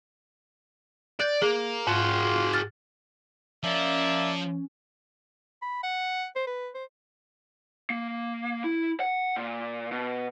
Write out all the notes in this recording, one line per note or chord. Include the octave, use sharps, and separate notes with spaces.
D5 F#6 G6
A#3 G#4
G#2 F4 F#4 G#4
F6 A6
F3 A#3 C#4 D5 E5
B5
F#5
C5
B4
C5
A#3
E4
F#5
A#2
B2